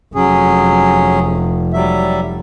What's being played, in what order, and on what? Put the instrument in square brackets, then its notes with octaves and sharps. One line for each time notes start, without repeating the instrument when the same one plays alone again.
[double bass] F1 [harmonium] F#3 C#4 G#4
[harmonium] F#3 G3 E5